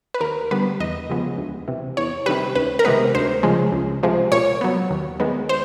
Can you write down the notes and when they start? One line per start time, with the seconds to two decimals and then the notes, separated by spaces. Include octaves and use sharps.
0.14 B4
0.21 D#2 A#4
0.51 D3 G3 B3 B4
0.80 E2 D#5
1.09 C#3 F3 G#3 B3
1.38 D2
1.68 C3 E3
1.97 E2 C#5
2.26 C3 D#3 G3 B4
2.55 C#2 B4
2.79 A#4
2.85 C3 D#3 G#3 B3 B4
3.15 D2 C5
3.43 C#3 F3 G#3
3.72 C#2
4.03 C3 F3 G#3
4.32 A#2 C#5
4.61 F#3 B3
4.90 D#2
5.20 D#3 G#3 B3
5.49 C5